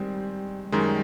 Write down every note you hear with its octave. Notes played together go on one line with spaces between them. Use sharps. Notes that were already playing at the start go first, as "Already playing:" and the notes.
Already playing: D#3 G3 G#3 C4
F#2 D#3 G3 G#3